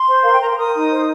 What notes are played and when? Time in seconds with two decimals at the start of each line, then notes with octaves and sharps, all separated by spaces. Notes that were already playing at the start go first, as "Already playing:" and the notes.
Already playing: C6
0.08 C5
0.22 A#4 F5
0.31 G5
0.41 A#4 A#5
0.49 C6
0.57 A#4 D#6
0.74 D#4
0.91 C5